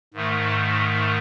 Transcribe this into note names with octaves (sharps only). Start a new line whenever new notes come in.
G#2 D#3 A3